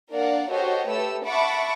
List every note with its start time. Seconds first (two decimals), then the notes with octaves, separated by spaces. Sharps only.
0.10 A#3 D4 A#4 D5 F5 F#5
0.50 F#4 G4 A4 C5 C#5 D#5
0.88 A3 G4 A4 B4 E6
1.24 E5 F#5 A5 B5 C#6 D6